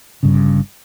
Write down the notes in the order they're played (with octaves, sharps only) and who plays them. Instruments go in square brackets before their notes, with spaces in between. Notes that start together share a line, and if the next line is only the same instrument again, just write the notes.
[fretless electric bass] G1 G2 C#3